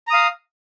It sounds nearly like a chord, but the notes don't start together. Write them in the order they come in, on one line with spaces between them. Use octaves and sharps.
A#5 D#6 F5